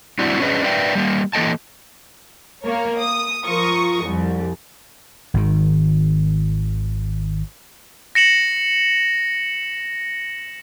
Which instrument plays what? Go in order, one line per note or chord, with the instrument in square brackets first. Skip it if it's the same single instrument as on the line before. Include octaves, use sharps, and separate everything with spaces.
[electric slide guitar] G3 C4 D4 E4 F#4
C#4 D4 G#4 B4 D#5
A#4 B4 D5 E5 G5
G3 A#3
E3 A#3 A4 D#5 G5 A5
[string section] A#3 A#4 C#5
D#6
F3 F4 A#4 C#6 D#6
C2 F2 G3
[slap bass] G#1 D#3
[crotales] A#6 C#7 E7 F#7